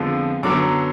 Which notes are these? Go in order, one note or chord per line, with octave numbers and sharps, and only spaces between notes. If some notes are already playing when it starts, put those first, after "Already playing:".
Already playing: F2 D3 F3 G#3 B3
F#2 D3 F#3 B3 D6